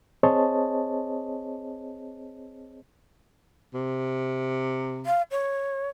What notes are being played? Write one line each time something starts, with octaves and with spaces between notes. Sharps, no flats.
C4 G#4 C5 C#5 D#5 A5
C3
F5
C#5